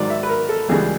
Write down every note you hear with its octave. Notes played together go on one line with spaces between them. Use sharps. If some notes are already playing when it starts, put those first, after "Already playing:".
Already playing: G#2 D#3 F#3 D5
E5
B4
A#4
A4
C#2 C#3 E3 G3 G#4